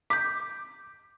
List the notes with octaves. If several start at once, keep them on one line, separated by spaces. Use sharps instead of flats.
D6 G6 B6